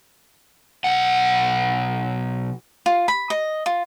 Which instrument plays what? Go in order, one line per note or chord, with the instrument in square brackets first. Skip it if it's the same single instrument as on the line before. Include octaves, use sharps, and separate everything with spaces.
[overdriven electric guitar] B1 F#5
[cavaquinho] F4
B5
D#5
F4